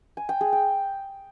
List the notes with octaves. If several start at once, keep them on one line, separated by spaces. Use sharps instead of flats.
G#5
G5
G#4
G5